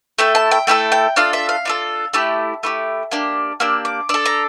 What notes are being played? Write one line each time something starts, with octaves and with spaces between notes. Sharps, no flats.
A3 E4 A4 G5
A5
G5
A3 E4 A4 G5
G5
D4 F4 A4 F5
E5
F5
D4 F4 A4
A3 E4 G4 A5
A3 E4 G4
A#3 D4 G4
A#3 D4 G4 E6
D6
D4 A4 E6
A#5